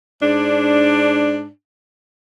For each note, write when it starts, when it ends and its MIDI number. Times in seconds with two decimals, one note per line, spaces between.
0.22 1.48 44
0.22 1.48 62